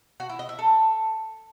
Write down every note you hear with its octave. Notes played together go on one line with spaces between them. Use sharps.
F#4
E4
D#5
E5
A4